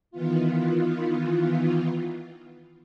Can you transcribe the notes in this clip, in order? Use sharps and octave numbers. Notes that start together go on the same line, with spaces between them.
D#3 E3 B3 F4